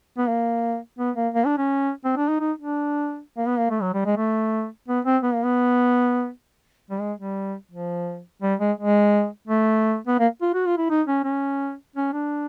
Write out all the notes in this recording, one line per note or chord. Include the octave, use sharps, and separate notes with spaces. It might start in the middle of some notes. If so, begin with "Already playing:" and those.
B3
A#3
B3
A#3
A#3
D4
C#4
C4
D4
D#4
D#4
D4
A#3
B3
A#3
A3
F#3
G3
G#3
A3
B3
C4
B3
A#3
B3
G3
G#3
G3
F3
G3
G#3
G#3
A3
B3
A#3
F4
F#4
F4
E4
D#4
C#4
C#4
C#4
D4